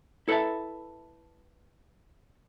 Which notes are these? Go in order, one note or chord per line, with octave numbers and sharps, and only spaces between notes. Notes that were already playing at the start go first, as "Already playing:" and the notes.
E4 A4 B4 C#5 E5 A5